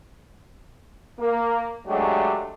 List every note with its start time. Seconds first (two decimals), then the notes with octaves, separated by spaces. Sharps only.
1.19 A#3
1.87 F#3 G#3 A3 D4 G4